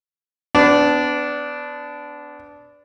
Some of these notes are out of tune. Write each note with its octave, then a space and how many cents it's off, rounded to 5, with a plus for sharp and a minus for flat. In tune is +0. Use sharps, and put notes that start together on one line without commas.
B3 +30 D4 -10